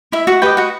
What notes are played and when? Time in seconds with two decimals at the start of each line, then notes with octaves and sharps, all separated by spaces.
0.12 E4 E5
0.27 F#4 F#5
0.42 G4 B4 D#5 G5
0.57 F#4 F#5